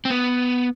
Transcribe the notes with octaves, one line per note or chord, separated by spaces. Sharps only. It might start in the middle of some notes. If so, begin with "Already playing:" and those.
C4
B3